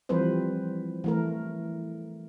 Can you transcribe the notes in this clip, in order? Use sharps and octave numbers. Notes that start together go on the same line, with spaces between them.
E3 F3 G3 C4 B4 C5
E3 A3 A#4